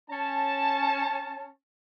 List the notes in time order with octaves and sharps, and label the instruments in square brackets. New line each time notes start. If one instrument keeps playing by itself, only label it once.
[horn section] C#4 A5